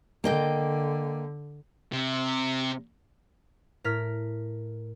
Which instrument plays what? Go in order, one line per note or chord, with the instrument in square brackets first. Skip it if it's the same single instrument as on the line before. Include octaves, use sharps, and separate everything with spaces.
[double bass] D3 [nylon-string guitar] A#3 D#5 G5
[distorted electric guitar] C3
[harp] A2 A#4 F6 B6